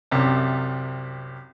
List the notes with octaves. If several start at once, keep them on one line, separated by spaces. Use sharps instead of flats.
C2 F#2 C3